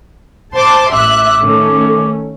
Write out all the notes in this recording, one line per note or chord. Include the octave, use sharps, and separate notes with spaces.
C5 A5 C6 D6
A1 E5 D6 F#6
D#3 A3 C#4